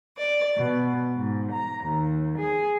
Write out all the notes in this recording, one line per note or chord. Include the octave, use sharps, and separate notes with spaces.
D5
B2
G#2
A#5
D#2
G#4